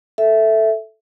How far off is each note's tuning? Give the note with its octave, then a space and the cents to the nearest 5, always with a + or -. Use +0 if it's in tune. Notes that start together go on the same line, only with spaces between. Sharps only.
A4 +0 E5 +0